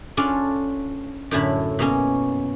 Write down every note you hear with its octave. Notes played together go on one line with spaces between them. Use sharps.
C#4 D4 F4 A4 D5
F#2 A2 D3 E4 A5 B5
B2 A#3 C#4